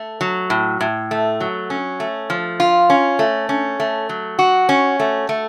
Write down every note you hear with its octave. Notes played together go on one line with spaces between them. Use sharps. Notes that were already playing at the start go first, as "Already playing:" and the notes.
Already playing: A3
F#3
A2
A2
A3
F#3
C#4
A3
F3
F4
C#4
A3
C#4
A3
F#3
F#4
C#4
A3
A3